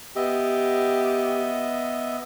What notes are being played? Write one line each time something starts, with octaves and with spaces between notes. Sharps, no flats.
B3 G4 D#5 E5